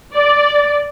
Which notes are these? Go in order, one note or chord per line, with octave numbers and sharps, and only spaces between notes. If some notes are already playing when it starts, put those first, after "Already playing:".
D5